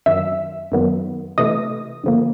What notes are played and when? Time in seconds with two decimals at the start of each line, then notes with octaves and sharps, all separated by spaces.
0.06 F#2 D#3 F#3 E5 E6
0.72 F#2 D#3 F#3 B3
1.38 C3 E3 A3 D#5 D#6
2.04 G2 D3 F3 A#3